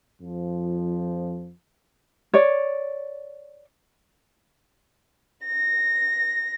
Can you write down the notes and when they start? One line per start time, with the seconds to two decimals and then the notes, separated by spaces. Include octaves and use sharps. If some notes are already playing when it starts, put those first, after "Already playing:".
0.21 F2 F3
2.34 C#5 D5
5.45 A#6